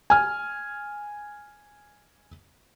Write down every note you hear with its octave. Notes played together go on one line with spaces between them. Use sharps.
G#5 F6